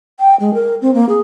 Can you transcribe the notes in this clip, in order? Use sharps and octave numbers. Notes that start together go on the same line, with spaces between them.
G5
G#3
A#4
C4
A#3
G#4